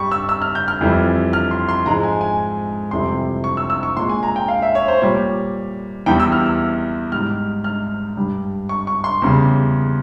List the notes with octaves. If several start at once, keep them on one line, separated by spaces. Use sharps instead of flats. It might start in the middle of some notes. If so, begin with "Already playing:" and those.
Already playing: G2 G3 C#6
E6
E6
F6
G6
F6
F2 E3 G3
F6
C6
C6
G#2 F3 G#3 A#5
G#5
G#5
F2 C3 E3 G3 C6
C#6
E6
E6
C#6
A#2 G#3 C6
G#5
A#5
G5
F5
E5
C#5
C5
A#2 G3 C#5
E2 E3 G3 G5
E6
F6
E6
G#2 G3 F6
F6
G2 G3
C#6
C#6
C6
E2 C#3 G3